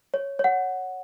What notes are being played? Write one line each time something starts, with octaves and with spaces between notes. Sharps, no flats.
C#5
C#5 F#5